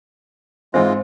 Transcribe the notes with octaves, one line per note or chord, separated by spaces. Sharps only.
G#2 E3 G#3 C4 F4 C5 E5